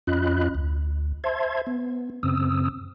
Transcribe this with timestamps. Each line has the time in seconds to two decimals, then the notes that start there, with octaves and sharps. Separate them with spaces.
0.07 F2 C#4 F4 D#5 B5 F#6
0.55 D2
1.24 C5 E5 A5 C6 G#6
1.67 B3
2.23 F#2 C#3 C4 D#6 E6